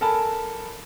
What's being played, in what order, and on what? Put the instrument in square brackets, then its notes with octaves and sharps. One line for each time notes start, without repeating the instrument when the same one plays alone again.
[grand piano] A4 A#4 G#5 A5 B5